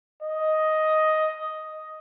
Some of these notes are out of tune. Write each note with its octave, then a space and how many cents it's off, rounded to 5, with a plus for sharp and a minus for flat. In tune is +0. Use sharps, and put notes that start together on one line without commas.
D#5 +5